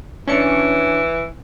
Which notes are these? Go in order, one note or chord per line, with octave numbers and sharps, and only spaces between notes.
E3 C#4 D4 C#7